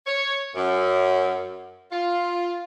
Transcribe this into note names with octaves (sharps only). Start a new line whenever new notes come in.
C#5
F#2
F4